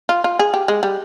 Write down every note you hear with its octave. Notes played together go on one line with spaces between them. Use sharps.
F4
F4
G#4
G4
G#3
G3